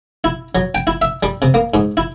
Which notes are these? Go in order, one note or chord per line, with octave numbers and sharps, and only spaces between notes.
E4
F#3
G5
E4
E5
G3
C3
A#3
G#2
E4